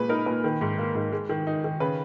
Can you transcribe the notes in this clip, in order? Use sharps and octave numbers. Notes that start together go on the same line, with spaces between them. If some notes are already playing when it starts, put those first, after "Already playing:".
Already playing: A#2 G#3 B4
D#4 A#4
A#2 B4
D#3
G#2
A#3
G#2
G#3
D#3
D#4
D#3
C#3 B4